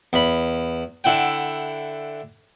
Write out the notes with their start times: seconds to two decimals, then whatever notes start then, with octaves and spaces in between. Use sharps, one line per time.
0.13 E2 B5
1.04 D3 E4 F#5 G5